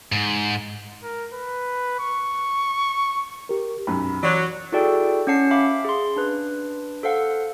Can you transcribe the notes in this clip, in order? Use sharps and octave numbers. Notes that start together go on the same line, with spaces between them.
G#2
A#4
B4
C#6
G4 A#4
B1 F#2 B5
E3 F#3 D5
E4 F#4 G#4 A4 D5 G5
C#4 C#5 F#5 A5 C7
E5 F5 B5 D6
G#4 C6
D4 B4
A4 C5 F5 F#5